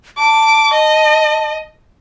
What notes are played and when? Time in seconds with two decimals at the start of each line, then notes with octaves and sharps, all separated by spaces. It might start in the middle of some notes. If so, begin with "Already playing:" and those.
0.18 A5 D6
0.74 D#5